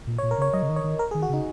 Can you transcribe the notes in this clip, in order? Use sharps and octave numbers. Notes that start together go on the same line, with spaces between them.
A#2
C#5
A#2
A#4
C#3 C#5
F#3 D#5
C#3
D#3
C#5
D#3
A#4
G#4
D#3
F#4
C#3 D#4